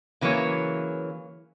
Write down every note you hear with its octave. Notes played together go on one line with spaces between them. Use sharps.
C#3 E3 F#3 A#3 C#5